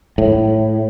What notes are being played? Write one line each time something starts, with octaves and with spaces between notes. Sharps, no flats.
A2